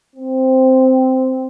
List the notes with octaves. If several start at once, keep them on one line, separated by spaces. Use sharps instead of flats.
C4